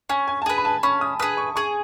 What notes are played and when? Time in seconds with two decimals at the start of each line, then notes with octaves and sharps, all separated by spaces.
0.09 C#4 G#5
0.28 G#5
0.42 A5
0.46 G#4 B4 G#5
0.58 B5
0.65 A5
0.83 C#4 B5
1.01 D#6
1.20 G#4 B4 D#6
1.37 C#6
1.56 G#4 C#6